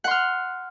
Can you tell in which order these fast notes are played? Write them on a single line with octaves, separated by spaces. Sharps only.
F#5 C6 F6